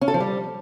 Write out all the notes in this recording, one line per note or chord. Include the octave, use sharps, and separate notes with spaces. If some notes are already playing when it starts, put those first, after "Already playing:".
C#4
A4
F3
G3